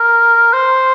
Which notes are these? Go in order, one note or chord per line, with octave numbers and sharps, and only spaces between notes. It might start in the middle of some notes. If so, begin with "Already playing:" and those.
Already playing: A#4
C5